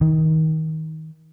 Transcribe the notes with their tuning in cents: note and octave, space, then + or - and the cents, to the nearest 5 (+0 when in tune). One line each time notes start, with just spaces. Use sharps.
D#3 +25